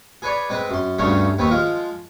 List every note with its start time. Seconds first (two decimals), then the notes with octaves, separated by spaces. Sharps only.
0.22 G#4 B4 C#5 D5
0.49 G#3 C4 B4
0.70 F#2 C6
0.98 D2 G2 C#3 A3 C#5 C6
1.38 D#2 C4 B4 C#5
1.51 F3 G#3 F4